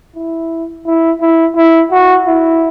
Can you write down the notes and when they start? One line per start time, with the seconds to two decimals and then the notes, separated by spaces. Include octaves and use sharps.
0.16 E4
0.87 E4
1.21 E4
1.56 E4
1.92 F#4
2.27 E4